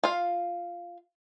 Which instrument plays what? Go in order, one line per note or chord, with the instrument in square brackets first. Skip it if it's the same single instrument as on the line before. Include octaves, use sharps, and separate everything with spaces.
[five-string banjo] F4 F5